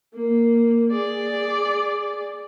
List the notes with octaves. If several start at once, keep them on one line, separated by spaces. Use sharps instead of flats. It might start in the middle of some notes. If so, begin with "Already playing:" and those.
A#3
G#4 D5